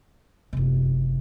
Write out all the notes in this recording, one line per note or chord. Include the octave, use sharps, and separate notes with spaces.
F#1 C3